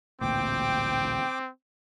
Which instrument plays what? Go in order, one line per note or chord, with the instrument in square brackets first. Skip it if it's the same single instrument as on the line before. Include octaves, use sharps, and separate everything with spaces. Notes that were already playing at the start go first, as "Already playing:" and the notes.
[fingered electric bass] A1 D2 A#2 [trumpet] C4 [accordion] G5 D6